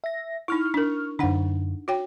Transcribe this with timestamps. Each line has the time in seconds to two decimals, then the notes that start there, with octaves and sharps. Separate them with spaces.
0.04 E5 A#6
0.48 D#4 E4 C#6 F6
0.74 D4 A#4
1.19 F#2 D3 D4 D#4 F#5
1.88 F#4 C#5 G5